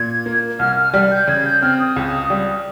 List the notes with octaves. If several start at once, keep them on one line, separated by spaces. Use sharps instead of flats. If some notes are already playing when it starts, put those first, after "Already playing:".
Already playing: A#2 G#6
A#3
C2 F6
F6
G3 F6
G6
C#3 G#6
G6
C4 F6
D#6
C#2
G3